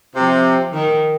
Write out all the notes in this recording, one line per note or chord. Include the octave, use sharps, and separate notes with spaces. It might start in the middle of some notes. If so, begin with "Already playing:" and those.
C3 F3
D#3